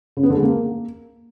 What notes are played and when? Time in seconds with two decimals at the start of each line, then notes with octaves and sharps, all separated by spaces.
0.17 C#3
0.23 B3
0.30 D3
0.37 G#3
0.43 A#3